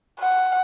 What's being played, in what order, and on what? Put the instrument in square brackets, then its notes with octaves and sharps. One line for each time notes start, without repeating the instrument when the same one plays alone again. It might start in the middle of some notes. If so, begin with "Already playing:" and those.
[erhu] F#5